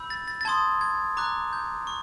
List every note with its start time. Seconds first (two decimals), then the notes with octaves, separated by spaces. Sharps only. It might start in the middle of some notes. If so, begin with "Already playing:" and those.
Already playing: B5 E6 G6
0.10 A6
0.28 A6
0.41 A6
0.45 A5 C6 D#6 G#6
0.81 G#6
1.17 A#5 D6 F#6
1.53 G6
1.87 C#6